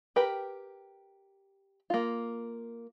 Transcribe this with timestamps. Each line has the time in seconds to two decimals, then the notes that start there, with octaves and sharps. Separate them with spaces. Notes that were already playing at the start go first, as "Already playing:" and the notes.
0.16 G4 A#4 B4 G5
1.90 A#3 F4